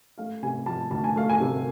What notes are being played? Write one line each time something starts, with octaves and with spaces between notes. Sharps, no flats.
A3 F5
C3 G#5
F3 A5
D2 A5
G#5
A3 F5
G#5
C3